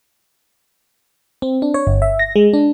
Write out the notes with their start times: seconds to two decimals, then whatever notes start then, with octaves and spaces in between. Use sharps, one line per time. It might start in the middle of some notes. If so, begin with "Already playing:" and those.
1.42 C4
1.62 D4
1.74 C#5
1.87 G1
2.02 E5
2.19 A#6
2.36 G#3
2.53 D4